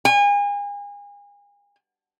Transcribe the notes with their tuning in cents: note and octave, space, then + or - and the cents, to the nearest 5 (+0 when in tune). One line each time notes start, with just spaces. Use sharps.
G#5 -35